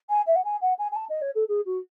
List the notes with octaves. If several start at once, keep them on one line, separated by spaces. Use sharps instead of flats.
G#5
E5
F#5
G#5
F#5
G#5
G#5
A5
D#5
C#5
A4
G#4
F#4